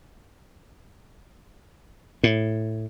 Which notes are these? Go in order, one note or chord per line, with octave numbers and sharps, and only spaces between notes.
A2